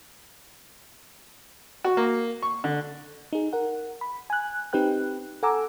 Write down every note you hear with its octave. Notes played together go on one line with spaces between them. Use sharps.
F#4
A#3
C#6
D3
D#4 G#4
A#4 F#5
B5
G#5 F#6
C4 D#4 G4 B4 G5 F#6
A4 F#5 G#5 A#5 D6 E6